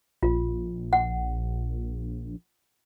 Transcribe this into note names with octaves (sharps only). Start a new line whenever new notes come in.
A#1 F4
F#5